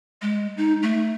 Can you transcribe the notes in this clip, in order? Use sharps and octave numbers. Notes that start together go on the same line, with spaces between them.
G#3
D#4
A3